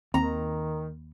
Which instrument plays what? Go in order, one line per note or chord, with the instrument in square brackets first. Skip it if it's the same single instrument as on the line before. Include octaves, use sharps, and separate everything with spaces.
[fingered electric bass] D#2 [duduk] D#3 [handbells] C4 [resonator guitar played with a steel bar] A#5